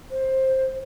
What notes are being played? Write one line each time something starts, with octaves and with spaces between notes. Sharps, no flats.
C5